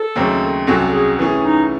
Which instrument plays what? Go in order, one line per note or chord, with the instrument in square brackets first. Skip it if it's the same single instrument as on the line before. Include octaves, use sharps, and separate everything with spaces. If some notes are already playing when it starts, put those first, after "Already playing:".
Already playing: [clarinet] A4
[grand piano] D#2 C#3 F#3 A3 C4
[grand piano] C2 C3 F#3 C#4 F#4 [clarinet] A4
[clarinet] G#4
[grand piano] E3 A3 C#4 G#4
[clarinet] D#4